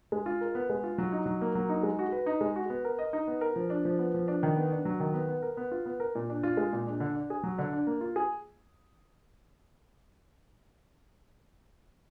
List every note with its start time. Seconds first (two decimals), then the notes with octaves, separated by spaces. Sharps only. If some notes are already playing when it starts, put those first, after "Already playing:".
0.12 G#3
0.26 F4
0.41 A#4
0.55 B3
0.70 G#3
0.84 F4
0.98 F#3
1.12 D#4
1.26 F#3
1.41 A#3
1.55 F#3
1.69 D#4
1.83 G#3
1.99 F#4
2.12 B4
2.26 D#4
2.41 G#3
2.56 F#4
2.70 B3
2.85 A#4
2.99 D#5
3.13 D#4
3.27 B3
3.41 A#4
3.56 F3
3.70 D4
3.85 F3
3.99 B3
4.14 F3
4.28 D4
4.43 D#3
4.56 B3
4.72 D4
4.85 F#3
5.00 D#3
5.14 B3
5.28 B3
5.42 A#4
5.57 B3
5.71 F4
5.86 B3
6.00 A#4
6.15 A#2
6.30 D4
6.43 F4
6.57 G#3
6.73 A#2
6.87 D4
7.00 D3
7.15 D4
7.30 G#4
7.43 F#3
7.58 D3
7.73 D4
7.87 A#3
8.01 F4
8.16 G#4